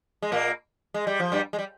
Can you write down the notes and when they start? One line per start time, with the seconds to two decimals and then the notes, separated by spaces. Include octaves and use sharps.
0.22 G#3
0.32 A#2 A#3
0.94 G#3
1.07 G3
1.20 F3
1.32 G2 G3
1.53 G#3
1.59 G3